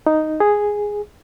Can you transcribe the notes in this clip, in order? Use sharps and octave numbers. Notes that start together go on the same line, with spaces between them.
D#4
G#4